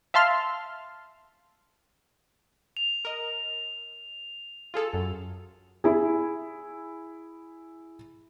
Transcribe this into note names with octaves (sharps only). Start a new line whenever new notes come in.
E5 F5 A5 C6 F6
F7
A#4 D#5
F4 G#4 A4
F#2
E4 G#4